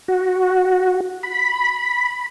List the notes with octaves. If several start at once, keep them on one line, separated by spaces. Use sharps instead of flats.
F#4
B5